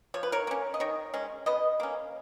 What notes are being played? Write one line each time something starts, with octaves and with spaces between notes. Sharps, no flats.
F3 C#5
B4
A#4 C#5
A#3 C#4
D#5
D#3 A#4 C#5
G#3 C#4
B2 B4 D#5
A#3 C#4